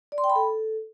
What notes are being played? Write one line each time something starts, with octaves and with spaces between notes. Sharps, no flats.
D5
C6
G5
B5
A4